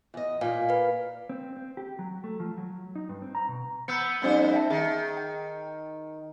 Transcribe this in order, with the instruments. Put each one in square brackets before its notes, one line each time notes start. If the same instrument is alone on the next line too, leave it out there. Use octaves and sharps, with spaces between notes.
[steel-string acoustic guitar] E2 D#5
[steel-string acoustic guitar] A#2 A#3 [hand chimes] F5 G#5
[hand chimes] B4 F5
[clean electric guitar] C4
C4
G4
F#3
A3
F3
F#3
D#4
G2
C4
A#5
B2
[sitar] B3 [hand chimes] E6 G6 C#7
[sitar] F2 G3 C5 [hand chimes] B3 C#4 D#4
[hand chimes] E5 G5 A5
[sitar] D#3 [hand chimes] G#4
[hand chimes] G5